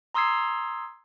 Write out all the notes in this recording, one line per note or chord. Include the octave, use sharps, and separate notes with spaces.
A#5 C6 D#6 E6 G#6 C7